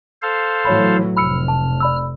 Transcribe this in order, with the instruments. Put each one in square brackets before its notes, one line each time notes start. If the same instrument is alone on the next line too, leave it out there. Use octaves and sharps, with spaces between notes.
[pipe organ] A4 C5 F5
[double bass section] A2 E3 F#3 [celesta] C#5 B5
[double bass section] F1 [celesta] B5 E6 C#7 [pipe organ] F6
[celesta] A5
D5 B5 E6